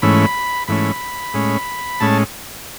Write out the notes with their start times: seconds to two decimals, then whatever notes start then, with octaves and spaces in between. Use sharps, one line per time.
0.02 G#2 E3 A3 C#4 B5
0.68 G#2 E3 A3 C#4 B5
1.34 A2 G#3 C#4
2.00 A2 G#3 C#4 A5